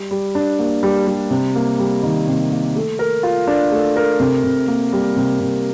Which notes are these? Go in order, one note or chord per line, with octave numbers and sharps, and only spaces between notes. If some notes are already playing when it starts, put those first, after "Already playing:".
Already playing: G3
G3
D4
A#3
G3
G3
C3
A#3
G3
D#3
C3
A#3
A3
A#4
F4
D4
A3
A#4
C3
C3
A#3
G3
C3
C3